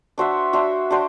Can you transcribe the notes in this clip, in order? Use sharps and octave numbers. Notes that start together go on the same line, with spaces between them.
D4 F#4 C5 E5
D4 F#4 C5 E5
D4 F#4 C5